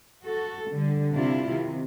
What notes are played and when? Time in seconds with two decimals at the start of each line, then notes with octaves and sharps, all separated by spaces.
0.24 F#4 A4
0.70 D3 G3
1.14 C3 D4 E4 F4
1.51 C3 D#3